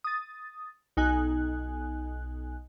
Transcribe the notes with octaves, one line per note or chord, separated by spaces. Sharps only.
D#6 A6
B1 D#4 G#5 F#6